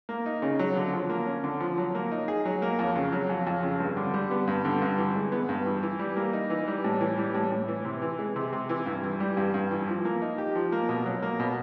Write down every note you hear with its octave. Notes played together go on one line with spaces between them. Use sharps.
A#3
D#4
C#3
F#3
D3
F3
A#3
C#4
D3
F3
F#3
A#3
D#4
G#4
F#3
A#3
F2
C#3
F#3
F2
F2
C#3
G2
D3
G3
B3
G2
D3
G2
E3
G#3
B3
G2
E3
E3
G3
A#3
D#4
E3
G3
A2
E3
G3
A2
A2
E3
C3
E3
G#3
C3
C3
E3
G2
E3
G3
G2
G2
E3
F3
A#3
D#4
G4
F3
A#3
B2
F#3
A#3
B2